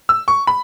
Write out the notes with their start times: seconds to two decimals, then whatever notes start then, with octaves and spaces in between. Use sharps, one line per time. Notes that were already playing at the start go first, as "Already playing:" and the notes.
0.09 E6
0.28 C#6
0.47 B5